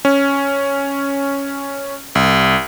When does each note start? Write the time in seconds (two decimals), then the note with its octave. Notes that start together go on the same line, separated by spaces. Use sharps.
0.05 C#4
2.15 C2